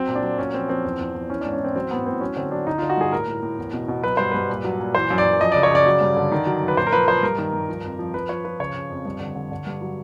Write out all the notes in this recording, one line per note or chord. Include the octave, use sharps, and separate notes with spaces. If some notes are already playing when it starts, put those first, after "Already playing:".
Already playing: F#3 C4
A#2
D4
F#3
A#2 C#4
F3 C4
F3 C4
E2
E2
E2
E3 C#4
G#2 D4
C#4
E3 C4
F#3 C4
A2 B3
A2 C4
F#3 C#4
D3 C4
F#3 D4
D3 D#4
D3 F4
F#4
G2 G#4
A2 A#4
A2
A2
E2
B2
B2
F#3 B4
G2 C5
G2 B4
A#2
F#3
A#2
E3 C5
F#2
D5
F#2
F3 D#5
C#3 D5
C#5
C#3 D5
F#3
G2
D3
D#3
F#3
F#2
B4
A#2 C5
A#4
F3 B4
F3 C5
G2 A#4
D#3
G2
F3
F2
F3
F3 B4
F3 C#5
F3 B4
C#3 C#5
C#3
F2
G2
D3
D3
D3
G2
F#3